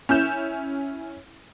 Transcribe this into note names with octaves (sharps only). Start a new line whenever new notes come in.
C#4 E4 G6 E7